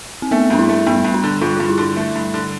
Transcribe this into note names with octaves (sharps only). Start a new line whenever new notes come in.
C4
A3 B3
G2 D4
E4
A3
G2 B3
G2
D4
D3
G2 F4
G2 F4
E4
D3
A3
G2
D3